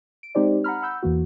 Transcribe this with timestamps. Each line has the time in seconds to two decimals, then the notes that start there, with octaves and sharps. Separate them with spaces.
0.23 D7
0.35 G#3 C4 D#4 G4 C5 D5
0.64 F#5 A#5 B5 F6
0.82 F#5 B5 E6 G6
1.03 E2 E3 A#3 F#4